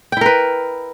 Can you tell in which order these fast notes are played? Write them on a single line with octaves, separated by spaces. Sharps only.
G5 E4 A#4 B4